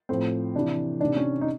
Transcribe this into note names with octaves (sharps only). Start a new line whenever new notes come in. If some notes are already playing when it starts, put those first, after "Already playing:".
A2 F3 C4
C3 E3 D4
C3 D#3 D4
C#4
D#4